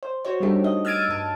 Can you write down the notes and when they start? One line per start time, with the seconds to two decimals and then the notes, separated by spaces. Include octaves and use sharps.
0.03 C5
0.25 F#4 C5 C#5
0.40 G3 A3 D4 D#4 G4 A4
0.64 D#5
0.85 E6 F6 G#6 A6 D7 D#7
1.08 G2 A5